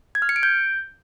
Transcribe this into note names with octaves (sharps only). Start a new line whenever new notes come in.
G#6
F6
C#7
D7
G6